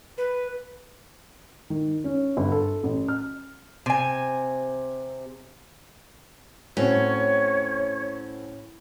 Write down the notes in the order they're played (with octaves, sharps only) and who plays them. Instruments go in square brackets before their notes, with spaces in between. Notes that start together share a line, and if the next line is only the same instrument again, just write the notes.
[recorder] B4
[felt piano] D#3
C#4
G1
A4
A1
F6
[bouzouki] C3 G#5
[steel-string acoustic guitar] A2 [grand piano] C4 F#4 [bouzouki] C#4 [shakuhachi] C#5